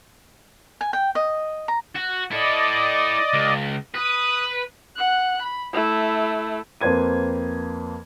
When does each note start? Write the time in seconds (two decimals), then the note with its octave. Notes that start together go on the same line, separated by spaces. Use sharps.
0.81 G#5
0.93 G5
1.15 D#5
1.68 A#5
1.96 F#4
2.32 E4 A4 D5 D#5
3.33 C#2
3.94 B4 D#6
4.96 F#5 F#6
5.42 B5
5.73 A3 E4
6.81 F2 A#3 B4 C5 G#6 D#7